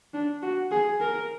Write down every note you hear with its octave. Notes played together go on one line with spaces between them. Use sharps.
D4
F#4
G#4
A#4